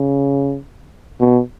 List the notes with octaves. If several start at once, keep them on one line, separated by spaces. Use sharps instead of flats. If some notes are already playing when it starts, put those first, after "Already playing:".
Already playing: C#3
B2